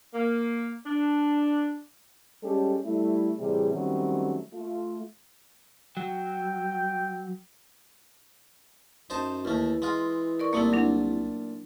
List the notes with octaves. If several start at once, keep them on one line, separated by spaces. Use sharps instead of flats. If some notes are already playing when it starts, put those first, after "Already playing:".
A#3
D4
G3 G#3 C#4 G4 A4
G3 A3 E4
A2 C3 E3 G3 G#4
D#3 F#3 G3 A3 C4 C#4
A3 F4
F#3 G5
F#2 D#4 C5 A5
D#2 E3 A3
G#3 F4
A#4 D5 C#6
C2 A#2 A3 A#3 D#4 E4
F#3 D4